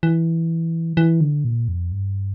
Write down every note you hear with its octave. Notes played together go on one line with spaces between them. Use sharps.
E3
E3
D3
A#2
F2
G2